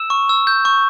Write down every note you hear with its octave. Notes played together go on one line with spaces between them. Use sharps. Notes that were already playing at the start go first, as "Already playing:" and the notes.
Already playing: E6 E7
C#6
E6
G6
C#6